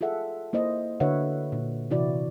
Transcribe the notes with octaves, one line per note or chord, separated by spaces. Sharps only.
F4 G#4 A4 E5 F#5
A#3 E4 C5 D#5
D3 F#4 B4 C#5 E5 F#5
A#2
C3 E3 E4 F#4 D5